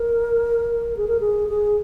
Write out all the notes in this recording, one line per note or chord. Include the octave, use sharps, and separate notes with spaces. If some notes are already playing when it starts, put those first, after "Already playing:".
Already playing: A#4
G#4
A#4
G#4
G#4